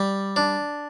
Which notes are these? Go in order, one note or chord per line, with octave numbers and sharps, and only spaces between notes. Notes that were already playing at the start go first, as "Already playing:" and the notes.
Already playing: G3
D4